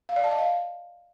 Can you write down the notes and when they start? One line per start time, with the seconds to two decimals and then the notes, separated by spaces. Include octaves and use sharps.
0.09 F5
0.16 D5
0.24 A5
0.31 D#5
0.39 F5